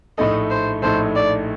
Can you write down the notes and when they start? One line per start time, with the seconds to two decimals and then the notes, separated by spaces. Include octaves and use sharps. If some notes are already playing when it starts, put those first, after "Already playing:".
0.18 A#1 A2 A3 D#4 A4 D#5
0.51 C5
0.82 A#1 A2 A3 D#4 A4 C5
1.15 D5